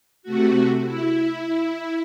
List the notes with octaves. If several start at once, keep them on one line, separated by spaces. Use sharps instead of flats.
C3 A3 F#4
E4